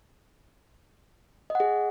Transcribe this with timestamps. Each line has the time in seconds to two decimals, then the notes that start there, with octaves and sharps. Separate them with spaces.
1.50 D#5
1.55 F#5
1.60 G#4